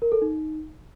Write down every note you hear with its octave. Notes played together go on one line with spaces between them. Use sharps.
A#4
A4
D#4